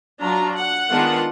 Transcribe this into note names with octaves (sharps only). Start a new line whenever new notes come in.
F#3 D4 F4 A#5
F#5
D#3 G#3 B3 D4 F4